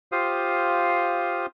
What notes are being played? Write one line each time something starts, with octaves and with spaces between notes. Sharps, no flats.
F4 G4 C5 F5 D#6